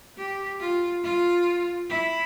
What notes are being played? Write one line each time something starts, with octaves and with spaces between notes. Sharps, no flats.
G4
F4
F4
E4